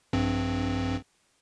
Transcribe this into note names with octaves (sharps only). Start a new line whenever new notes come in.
A#1 G2 C4